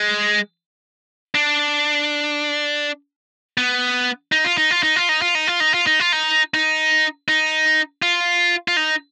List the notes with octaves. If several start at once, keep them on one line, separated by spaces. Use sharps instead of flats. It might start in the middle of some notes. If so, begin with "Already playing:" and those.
Already playing: G#3
D4
B3
D#4
F4
D#4
F4
D#4
F4
D#4
F4
D#4
F4
D#4
F4
D#4
F4
D#4
D#4
D#4
F4
F4
D#4